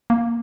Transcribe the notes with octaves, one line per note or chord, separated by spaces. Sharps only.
A#3